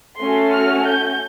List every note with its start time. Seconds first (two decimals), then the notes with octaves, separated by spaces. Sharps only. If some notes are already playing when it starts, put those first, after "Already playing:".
0.19 A3 C#4 F#4 A4 C6
0.52 F6
0.85 G6